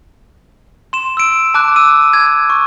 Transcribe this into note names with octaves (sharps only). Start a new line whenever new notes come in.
C6 E7
E6 D7
A5 D6 F#6
E6 D#7
G#6
C#6